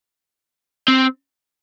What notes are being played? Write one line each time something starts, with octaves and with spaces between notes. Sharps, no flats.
C4